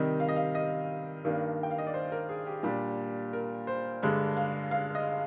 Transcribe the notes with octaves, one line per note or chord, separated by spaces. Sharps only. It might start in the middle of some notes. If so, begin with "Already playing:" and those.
Already playing: C3 D#3 G3 D#5
F5
D#5
F5
D#5
G2 D#3 A#3 D4
G5
F5
D#5
D5
C5
A#4
G#4
G4
A#2 G3 D4
A#4
C5
G2 D3 G#3 D4
F5
F5
D#5